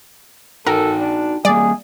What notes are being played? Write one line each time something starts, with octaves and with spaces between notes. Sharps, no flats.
D#4 F#4 A4 A#4 G5
D4
G3 A#3 G#4 D5